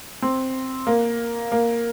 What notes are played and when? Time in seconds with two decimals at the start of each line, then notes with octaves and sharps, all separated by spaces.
0.22 C4
0.87 A#3
1.52 A#3